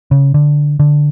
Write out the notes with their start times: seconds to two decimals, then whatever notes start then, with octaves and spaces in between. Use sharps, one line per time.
0.11 C#3
0.34 D3
0.80 D3